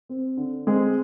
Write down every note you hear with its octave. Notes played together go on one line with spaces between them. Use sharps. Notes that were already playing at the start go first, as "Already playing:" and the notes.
C4
D3
G#3 C4 G#4